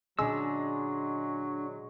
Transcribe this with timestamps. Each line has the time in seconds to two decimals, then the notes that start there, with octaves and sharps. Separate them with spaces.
0.19 A#2 D3 F#3 G#3 C#4 D4 E6